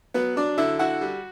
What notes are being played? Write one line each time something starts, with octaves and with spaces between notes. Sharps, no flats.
F#3 B3 B4
F#3 D4 D5
D3 E4 E5
E4 F#4 F#5
G3